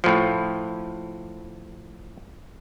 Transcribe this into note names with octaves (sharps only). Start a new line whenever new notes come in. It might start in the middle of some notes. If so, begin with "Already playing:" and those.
A2 F3